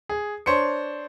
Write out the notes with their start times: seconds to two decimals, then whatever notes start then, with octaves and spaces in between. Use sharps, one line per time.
0.09 G#4
0.46 D4 C5 C#5 C#7